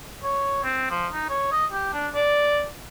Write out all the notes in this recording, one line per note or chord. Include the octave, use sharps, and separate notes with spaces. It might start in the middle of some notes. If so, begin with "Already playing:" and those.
C#5
C4
F3
D#4
C#5
D#5
G4
D4
D5